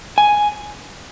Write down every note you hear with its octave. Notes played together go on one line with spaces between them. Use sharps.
G#5